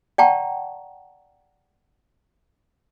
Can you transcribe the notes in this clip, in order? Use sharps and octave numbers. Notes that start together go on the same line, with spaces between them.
D5 F#5 G5 A5 A#5 C#6